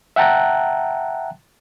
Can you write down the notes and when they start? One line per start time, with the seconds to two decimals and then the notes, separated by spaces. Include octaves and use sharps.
0.16 E5 F#5 G5 A5 A#5 F#6